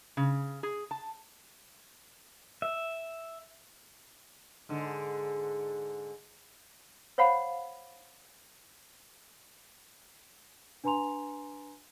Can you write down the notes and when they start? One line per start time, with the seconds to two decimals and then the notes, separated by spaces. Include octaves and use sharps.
0.17 C#3
0.63 G#4
0.91 A5
2.62 E5
4.69 G#2 D3
7.18 C5 C#5 F5 F#5 B5
10.84 D4 B4 G#5 A#5 C6 F7